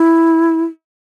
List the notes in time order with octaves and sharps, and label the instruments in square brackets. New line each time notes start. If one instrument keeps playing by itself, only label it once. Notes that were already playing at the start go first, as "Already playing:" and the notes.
Already playing: [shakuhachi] E4